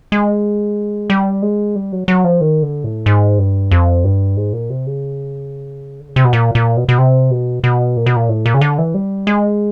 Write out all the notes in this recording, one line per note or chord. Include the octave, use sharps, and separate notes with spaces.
G#3
G3
G#3
G3
F#3
F#3
F3
D#3
D3
A2
G#2
G2
F2
G2
G#2
A#2
C3
C#3
D3
C#3
C3
B2
A#2
A#2
B2
B2
C3
B2
B2
A#2
B2
A#2
A2
A#2
C#3
D3
E3
G3
G#3